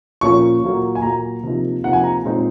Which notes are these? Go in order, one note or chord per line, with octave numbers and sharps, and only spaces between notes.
A#2 F3 A#3 C#4 C#6
A#2 F#3 A#3
G#5
A#2 F#3 A#3 A#5
C3 F3 A#3 D#4
C3 F3 A#3 D#4 F#5
G#5
A#5
A#2 G#3 C4 D#4